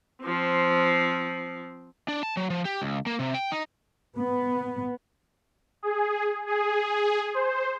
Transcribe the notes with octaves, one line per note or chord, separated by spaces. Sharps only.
F3 C4
D4
A5
F#3
F3
G4
C#2
A#3
C3
G5
D#4
B3
G#4
G#4
C5